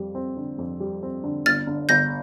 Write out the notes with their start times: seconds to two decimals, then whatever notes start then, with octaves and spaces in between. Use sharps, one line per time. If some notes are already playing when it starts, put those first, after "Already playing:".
Already playing: F2 G3
0.15 C4
0.37 D3
0.58 F2
0.80 G3
1.03 C4
1.24 D3
1.46 G1 F6 A6
1.67 D3
1.89 G1 G6 A#6